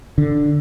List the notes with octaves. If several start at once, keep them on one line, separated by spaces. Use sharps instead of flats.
D3